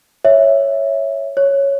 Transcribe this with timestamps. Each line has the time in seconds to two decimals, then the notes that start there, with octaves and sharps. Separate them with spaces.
0.25 C#5 E5
1.37 C#5